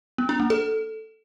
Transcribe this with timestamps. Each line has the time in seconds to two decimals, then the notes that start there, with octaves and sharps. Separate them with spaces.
0.18 B3
0.29 D4
0.40 A#3
0.50 A4